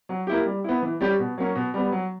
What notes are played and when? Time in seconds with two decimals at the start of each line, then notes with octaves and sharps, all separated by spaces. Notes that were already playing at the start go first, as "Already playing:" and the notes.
0.09 F#3
0.27 A#3 E4 G4
0.46 G3
0.64 B3 E4
0.82 E3
1.01 G3 C#4 G4
1.19 B2
1.38 F#3 A#3 C#4
1.55 B2
1.74 G3 B3
1.92 F#3